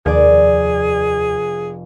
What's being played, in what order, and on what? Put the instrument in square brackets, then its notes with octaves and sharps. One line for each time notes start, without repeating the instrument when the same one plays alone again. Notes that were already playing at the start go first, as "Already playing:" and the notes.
[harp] F1 D5 [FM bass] D#2 [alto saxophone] G#4